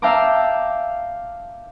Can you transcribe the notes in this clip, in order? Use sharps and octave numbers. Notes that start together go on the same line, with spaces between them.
E5 F5 G5 A5 A#5 D6